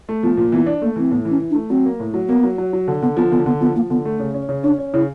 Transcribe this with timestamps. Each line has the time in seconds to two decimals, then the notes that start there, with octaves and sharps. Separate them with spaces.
0.09 A3
0.23 F3 B3
0.37 A#2
0.52 E3 B3
0.66 D4
0.82 A3 A#3
0.96 E3 C4
1.11 A2 B3
1.25 E3
1.31 C#4
1.40 E3
1.50 D4
1.55 A3
1.70 F#3 C4
1.85 A#3
2.00 A2
2.14 F#3
2.28 A#3 B3
2.44 F#3
2.58 F#3
2.73 F#3
2.88 D3
3.02 D3 B3
3.17 F3 B3
3.31 D3 B3
3.46 D3 B3
3.60 F3 B3
3.75 F3 A#3
3.90 D3 B3
4.05 A3
4.20 C#3
4.34 C#4
4.49 C#3
4.63 C#4 D4
4.79 C#4
4.94 C#3 E4